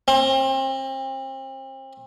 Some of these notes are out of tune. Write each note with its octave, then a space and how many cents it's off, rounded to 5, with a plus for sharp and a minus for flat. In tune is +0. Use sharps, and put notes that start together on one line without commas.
C4 +35